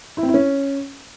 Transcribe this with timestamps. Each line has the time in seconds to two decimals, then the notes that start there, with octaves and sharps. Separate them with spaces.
0.17 E4
0.23 C4
0.28 E4
0.34 C#4